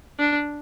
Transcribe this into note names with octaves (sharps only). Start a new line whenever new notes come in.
D4